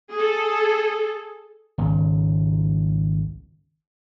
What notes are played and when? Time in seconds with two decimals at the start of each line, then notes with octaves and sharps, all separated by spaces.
0.13 G#4 A4
1.78 G#1 C#2